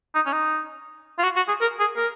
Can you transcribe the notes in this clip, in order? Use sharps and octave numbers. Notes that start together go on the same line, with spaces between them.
D#4
C#4
D#4
F4
F#4
F#4
G#4
A#4
G#4
A#4